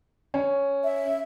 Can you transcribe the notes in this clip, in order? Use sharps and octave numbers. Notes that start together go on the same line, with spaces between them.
C#4
E5